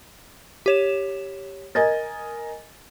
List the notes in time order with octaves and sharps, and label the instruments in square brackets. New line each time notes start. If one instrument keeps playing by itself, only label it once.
[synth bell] G4 C#5 E7
[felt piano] A#4 D#5 G#5 [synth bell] A6